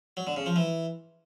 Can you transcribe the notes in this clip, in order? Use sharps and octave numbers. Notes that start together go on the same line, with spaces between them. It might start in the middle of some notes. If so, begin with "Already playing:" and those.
F#3
D3
C#3
F3
E3